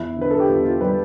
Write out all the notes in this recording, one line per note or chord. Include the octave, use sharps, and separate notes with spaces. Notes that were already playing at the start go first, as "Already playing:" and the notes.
Already playing: E2 E4
D3 B4
A4
G4
E2 F4
F4
G3 B4